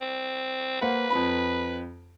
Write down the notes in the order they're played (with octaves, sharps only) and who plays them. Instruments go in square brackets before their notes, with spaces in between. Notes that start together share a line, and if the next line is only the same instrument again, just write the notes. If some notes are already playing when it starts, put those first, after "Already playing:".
[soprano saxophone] C4
[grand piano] A#3 C5 F#5 [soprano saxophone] B4
[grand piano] F2 C4 B5